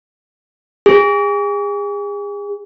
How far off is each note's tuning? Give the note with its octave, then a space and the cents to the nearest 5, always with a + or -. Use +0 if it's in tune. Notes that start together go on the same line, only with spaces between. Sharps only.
G#4 -35